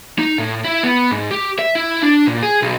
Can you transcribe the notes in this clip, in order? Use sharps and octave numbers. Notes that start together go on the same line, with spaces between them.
D#4
A2
E4
B3
G#2
G4
E5
E4
D4
A#2
G#4
B1